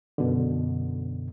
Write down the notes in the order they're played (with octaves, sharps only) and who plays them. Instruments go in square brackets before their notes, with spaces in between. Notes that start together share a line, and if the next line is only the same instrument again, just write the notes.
[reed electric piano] F#2 B2 D3